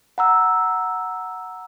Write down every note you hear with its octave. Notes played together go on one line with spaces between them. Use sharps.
F#5 A#5 E6